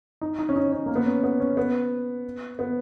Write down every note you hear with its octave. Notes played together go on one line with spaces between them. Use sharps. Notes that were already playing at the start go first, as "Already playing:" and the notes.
D#4
D#4
C#4
D#4
C#4
A#3
B3
C#4
B3
C#4
B3
B3